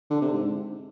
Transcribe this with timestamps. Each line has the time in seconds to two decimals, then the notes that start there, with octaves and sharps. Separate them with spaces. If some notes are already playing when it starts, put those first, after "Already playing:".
0.10 D3
0.21 C3
0.33 G#2